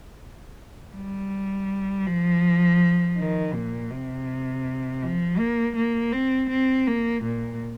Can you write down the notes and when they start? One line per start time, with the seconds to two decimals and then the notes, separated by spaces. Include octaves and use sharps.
0.95 G3
2.07 F3
3.17 D#3
3.54 A#2
3.91 C3
5.02 F3
5.38 A#3
5.75 A#3
6.13 C4
6.49 C4
6.87 A#3
7.23 A#2